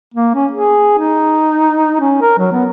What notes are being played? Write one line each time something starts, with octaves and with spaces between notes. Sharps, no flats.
A#3
C#4
G#4
D#4
C#4
A#4
F#3
B3